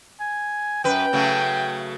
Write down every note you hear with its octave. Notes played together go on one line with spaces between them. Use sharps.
G#5
F#2 B4 G5
C#3 F#3 A3